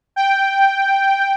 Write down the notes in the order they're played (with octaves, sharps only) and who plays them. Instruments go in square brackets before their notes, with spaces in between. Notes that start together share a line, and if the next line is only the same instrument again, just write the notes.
[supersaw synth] G5